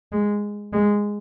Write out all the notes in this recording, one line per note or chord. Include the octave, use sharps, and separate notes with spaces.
G#3
G#3